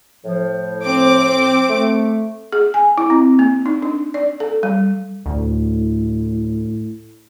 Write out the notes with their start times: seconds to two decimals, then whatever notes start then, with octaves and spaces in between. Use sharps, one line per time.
0.25 A2 F3
0.83 C4 D6
1.68 A3
2.52 G#4
2.74 G#5
2.98 E4
3.10 C4
3.39 A#3
3.66 D#4
3.82 D4
4.14 D5
4.40 A4
4.63 G3
5.26 D2 A2